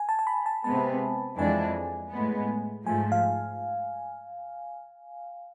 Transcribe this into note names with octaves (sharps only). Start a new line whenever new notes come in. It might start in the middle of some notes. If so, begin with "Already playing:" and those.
Already playing: G#5
A5
A5
B5
A5
C3 G#3 B3 A5
F2 E3 G#3 D4 G#5
A2 G#3 B3
G#2 F3 A3 G#5
F5